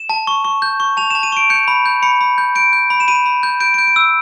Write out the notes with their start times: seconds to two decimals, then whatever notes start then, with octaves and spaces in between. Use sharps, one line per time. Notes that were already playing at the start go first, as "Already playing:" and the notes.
Already playing: E7
0.09 A5
0.27 C#6
0.45 C#6
0.62 G6
0.80 C#6
0.97 A5 F7
1.10 A5 E7
1.23 D#7
1.32 C#6 D7
1.50 G6 C#7
1.68 B5
1.86 G6
2.03 B5 C#7
2.21 B5
2.38 G6
2.55 G6 D7
2.73 G6
2.90 B5
3.00 E7
3.08 B5 D#7
3.26 B5
3.43 G6
3.60 G6 D7
3.74 D7
3.79 G6
3.87 D7
3.96 E6